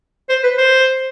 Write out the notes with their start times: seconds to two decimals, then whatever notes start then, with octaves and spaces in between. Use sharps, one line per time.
0.29 C5
0.43 B4
0.58 C5